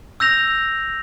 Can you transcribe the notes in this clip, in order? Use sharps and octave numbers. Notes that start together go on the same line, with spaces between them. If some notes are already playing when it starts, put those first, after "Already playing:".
E6 G6 A#6 F7